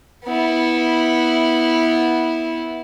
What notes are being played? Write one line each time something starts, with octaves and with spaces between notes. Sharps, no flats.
B3 E4